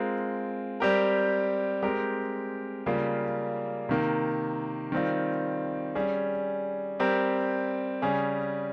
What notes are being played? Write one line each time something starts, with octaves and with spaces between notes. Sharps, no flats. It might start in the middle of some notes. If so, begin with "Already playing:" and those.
Already playing: G#3 C4 F4 A#4
G3 C4 G4 A#4
G#3 C4 G4 A#4
C#3 G3 A#3 F4
C3 D#3 A#3
D#3 G3 C4 F4
G3 C#4 G#4
G3 C4 G4 A#4
C#3 G3 C#4 G#4